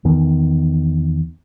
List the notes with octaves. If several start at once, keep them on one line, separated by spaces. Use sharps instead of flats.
E2 D#3 B3